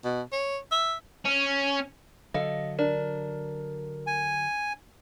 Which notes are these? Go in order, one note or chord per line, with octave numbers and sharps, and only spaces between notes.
B2
C#5
E5
C#4
D3 F#3 A4 D#5 F5
D4 A#4
G#5